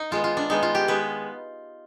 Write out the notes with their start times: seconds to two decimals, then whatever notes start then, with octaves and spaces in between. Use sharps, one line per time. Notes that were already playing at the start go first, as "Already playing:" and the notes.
Already playing: D#4
0.11 D#3 G#3 B3 F4
0.24 F4
0.37 D4
0.49 D#3 G#3 B3 D#4
0.63 F4
0.75 G4
0.88 D#3 G#3 B3 B4